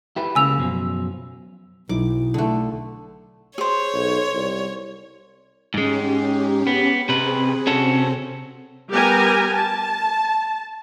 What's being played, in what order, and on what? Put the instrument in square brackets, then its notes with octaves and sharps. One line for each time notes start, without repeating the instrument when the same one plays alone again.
[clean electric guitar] E4 G4 B4
[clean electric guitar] C#2 C#3 A#3 [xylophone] G#5 E6 F7
[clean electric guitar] F#2 B2 F3
[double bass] B1 [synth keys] F#3 D#4 E4 [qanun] D6
[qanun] D3 A3
[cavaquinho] G#4 C5 [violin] C#5
[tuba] B1
C2
[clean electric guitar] G#2 G#3 [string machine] C#4 G4
[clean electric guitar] B3
[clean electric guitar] C3 B4 [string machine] C4 G#4
[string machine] C3 C4 [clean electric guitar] C#4 F#4 A4
[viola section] G3 B3 G4 A#4 G#5 A#5
A5